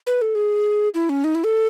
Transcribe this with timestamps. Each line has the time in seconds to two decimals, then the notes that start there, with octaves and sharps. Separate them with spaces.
0.07 B4
0.21 A4
0.35 G#4
0.94 E4
1.09 C#4
1.24 D#4
1.35 E4
1.44 A4